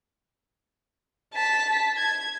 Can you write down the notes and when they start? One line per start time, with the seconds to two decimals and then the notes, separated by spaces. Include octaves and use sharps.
1.34 A5 B6
1.97 G#6